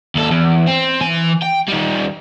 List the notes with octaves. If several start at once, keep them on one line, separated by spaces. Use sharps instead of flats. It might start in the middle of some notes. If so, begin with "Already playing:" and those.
D#2 A4
E2
C4
E3 G#5
G5
D#3 G3